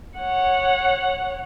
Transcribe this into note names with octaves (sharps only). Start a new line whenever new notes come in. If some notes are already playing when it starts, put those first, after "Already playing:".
C#5 F#5